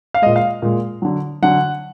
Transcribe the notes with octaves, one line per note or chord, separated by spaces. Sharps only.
F5
A#2 G#3 D#5
F5
A#2 G#3
D3 F#3
D3 F#3 F#5